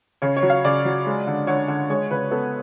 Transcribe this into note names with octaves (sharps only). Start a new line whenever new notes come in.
C#3 C#5
C#5
F#3
F5
C#3 D5
F#3
G#3
D3
D3 C#5
D3
G#3 C#5
C#3 B4
B3 A4